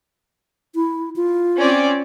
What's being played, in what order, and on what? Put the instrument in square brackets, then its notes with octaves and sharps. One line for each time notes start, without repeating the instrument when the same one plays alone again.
[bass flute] E4
F4
[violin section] C4 C#4 D5